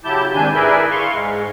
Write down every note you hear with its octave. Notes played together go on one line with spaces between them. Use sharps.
C#3 F#3 E4 G4 A5 G6
G#2 C3 D#3 D4 G#5 G6
E4 G#4 A#4 B4 D5 E5
F5 C6 C#6
G#2 G#3